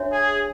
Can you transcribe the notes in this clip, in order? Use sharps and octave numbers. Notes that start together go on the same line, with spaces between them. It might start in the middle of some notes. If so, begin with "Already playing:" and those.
Already playing: D4 F#4 C#5 E5
G#4